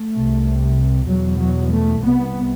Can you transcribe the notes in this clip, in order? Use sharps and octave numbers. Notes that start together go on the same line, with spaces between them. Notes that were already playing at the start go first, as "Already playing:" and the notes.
Already playing: A3
C2 C3
E2 B2 F#3
F#3
A3
C2 C3 B3